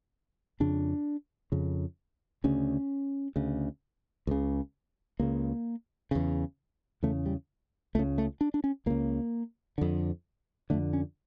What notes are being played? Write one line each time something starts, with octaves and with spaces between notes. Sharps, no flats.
F2 C#3 D4
F2 C#3
D2 C#3 C#4
D2 C#3
C#2 C#3
C#2 C#3 A#3
E2 C#3
E2 C#3 A3
G3
C#2 C#3 A3
A3
D4
D4
C#4
C#2 C#3 A#3
F2 D3
F2 D3 A3
C#4